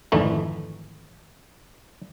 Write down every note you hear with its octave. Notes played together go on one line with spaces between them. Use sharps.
G#1 F2 D3 E3 A3 D#4